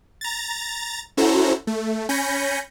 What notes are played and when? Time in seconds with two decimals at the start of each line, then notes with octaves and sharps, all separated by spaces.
0.21 A#5 A6
1.17 C#4 E4 F#4 A4 C5 A#5
1.67 A3
2.09 C#4 G#5 B5 G6 A#6 C#7